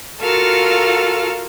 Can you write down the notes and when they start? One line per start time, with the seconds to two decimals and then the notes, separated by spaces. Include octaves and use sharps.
0.20 F4 F#4 A4 A#4 F5 A5